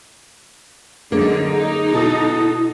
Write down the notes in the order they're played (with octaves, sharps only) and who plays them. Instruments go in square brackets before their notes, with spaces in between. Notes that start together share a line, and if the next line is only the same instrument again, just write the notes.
[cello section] F#2 D3 D#4 [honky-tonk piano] A#3 [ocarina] G#4
[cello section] D#4
[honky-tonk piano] B2 A4 D#6 [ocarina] E4